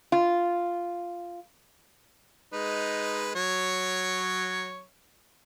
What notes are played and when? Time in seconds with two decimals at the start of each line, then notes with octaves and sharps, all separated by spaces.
0.12 F4
2.53 G#3 D#4 B4
3.35 F#3 C#5